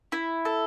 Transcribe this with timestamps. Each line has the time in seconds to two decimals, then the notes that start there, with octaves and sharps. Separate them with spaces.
0.12 E4
0.45 A4